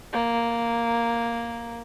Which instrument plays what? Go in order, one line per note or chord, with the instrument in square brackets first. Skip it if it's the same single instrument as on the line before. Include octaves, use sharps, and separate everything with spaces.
[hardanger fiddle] A#3